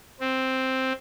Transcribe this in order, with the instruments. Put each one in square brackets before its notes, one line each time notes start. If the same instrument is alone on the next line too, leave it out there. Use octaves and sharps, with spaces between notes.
[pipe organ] C4